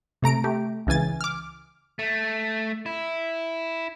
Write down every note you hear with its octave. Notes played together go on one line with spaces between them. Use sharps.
C3 A3 A#5 D7
A3 G4
C#2 C#3 E3 G#5 A6
D6 F6
A3
E4